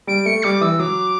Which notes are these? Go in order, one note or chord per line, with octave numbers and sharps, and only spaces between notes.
G3 D7
A3 C#7
G3 D6
E3 E6
F#3 D6